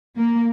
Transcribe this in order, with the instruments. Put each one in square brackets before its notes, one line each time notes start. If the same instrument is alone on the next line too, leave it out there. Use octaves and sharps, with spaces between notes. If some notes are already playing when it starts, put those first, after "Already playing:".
[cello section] A#3